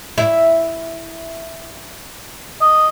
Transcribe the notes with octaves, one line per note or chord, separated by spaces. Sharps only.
E4
D#5